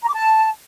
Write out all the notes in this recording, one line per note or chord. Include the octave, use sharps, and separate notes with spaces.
A#5
D6
A5